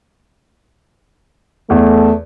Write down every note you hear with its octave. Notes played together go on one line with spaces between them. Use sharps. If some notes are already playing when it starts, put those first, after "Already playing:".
E2 A3